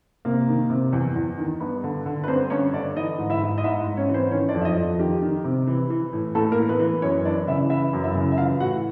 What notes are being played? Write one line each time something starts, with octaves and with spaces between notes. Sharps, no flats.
C3 A#3 A#4
D#3
C3
E2
E2
D#3
G2 B3 B4
D3
D3
B4
G2 C4 C5
G2 C#4 C#5
D3 D4 D5
E3 D#4 D#5
G#2
E4 E5
G#2
D#5
G#2 E4 E5
G#2
C#4 C#5
E3
C4 C5
D#3 C#4 C#5
D4 D5
F2
E5
D#4 D#5
F2
D#3 G4
D#3
C3
E3
E3
A2
A2 A3 A4
A#3 A#4
E3
B3 B4
E3
F#2 C#4 C#5
E3 D4 D5
C#3 E4 E5
E3 E4 E5
F#2
E4 E5
C#3
E5
E3 F4 F5
A2 F#4 F#5